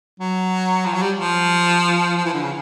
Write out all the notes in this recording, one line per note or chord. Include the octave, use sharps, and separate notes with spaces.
F#3
F3
F#3
G3
F3
F3
E3
D3
C#3